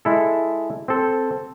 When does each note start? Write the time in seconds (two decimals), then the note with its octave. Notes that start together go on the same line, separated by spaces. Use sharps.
0.05 G#3 E4 A4
0.88 C4 A4